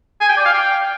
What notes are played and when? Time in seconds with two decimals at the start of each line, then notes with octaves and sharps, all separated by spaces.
0.21 G#5
0.29 G5
0.37 D5
0.45 F5
0.53 G5